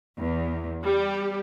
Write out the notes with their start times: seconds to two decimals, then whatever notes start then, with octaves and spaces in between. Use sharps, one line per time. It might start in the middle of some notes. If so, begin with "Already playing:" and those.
0.19 E2
0.85 G3 G4